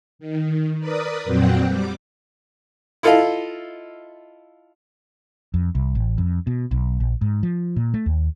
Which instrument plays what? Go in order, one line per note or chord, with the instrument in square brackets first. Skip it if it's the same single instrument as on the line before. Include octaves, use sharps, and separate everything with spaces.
[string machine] D#3
A#4 B4 D5 D#6
F2 A#2 F#3 C4 F#5 G5
G3 D6
[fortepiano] E4 F4 A4 D#5 F5
[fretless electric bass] F2
C2
A1
F2
B2
B1
A#1
G#2
F3
A#2
A3
D#2